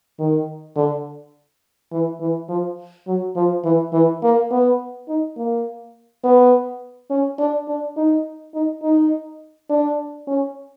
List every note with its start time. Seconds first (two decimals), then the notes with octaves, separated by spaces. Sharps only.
0.19 D#3
0.76 D3
1.92 E3
2.20 E3
2.49 F3
3.07 F#3
3.36 F3
3.65 E3
3.93 E3
4.23 A#3
4.51 B3
5.08 D#4
5.37 A#3
6.24 B3
7.10 C#4
7.39 D4
7.68 D4
7.97 D#4
8.54 D#4
8.83 D#4
9.70 D4
10.27 C#4